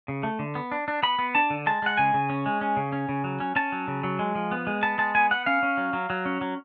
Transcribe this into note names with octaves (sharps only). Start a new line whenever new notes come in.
C#3
A3
D3
B3
D4
D4
B3 B5
B3
D4 A5
D3
G#3 A5
G#3 F#5
C#3 G#5
C#3
C#4
G#3
C#4
C#3
C#4
C#3
F#3
C#4
C#4 A5
F#3
C#3
F#3
G#3
F3
B3
G#3
B3 A5
G#3 A5
B3 G#5
B3 F#5
C#4 F5
C#4
F#3
F#3
F#3
C#4
F#3